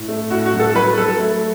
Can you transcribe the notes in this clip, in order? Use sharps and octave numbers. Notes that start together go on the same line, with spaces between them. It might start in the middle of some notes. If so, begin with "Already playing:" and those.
Already playing: A2
A3
A2 F#4
F#4
F#3
A4
F#3 B4
F#3 A4
A3